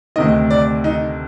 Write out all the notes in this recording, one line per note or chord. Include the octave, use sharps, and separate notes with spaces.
D2 C3 D#3 D#5
D5
D#4